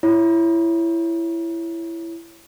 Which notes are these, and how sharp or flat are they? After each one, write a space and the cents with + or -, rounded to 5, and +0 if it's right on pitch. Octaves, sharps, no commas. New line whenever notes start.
E4 +15 C#5 +0